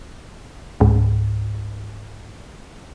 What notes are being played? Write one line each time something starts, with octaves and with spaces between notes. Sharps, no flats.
C#2 G#2